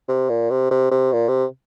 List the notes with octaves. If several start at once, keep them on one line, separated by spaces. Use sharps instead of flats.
C3
A#2
C3
C3
C3
A#2
C3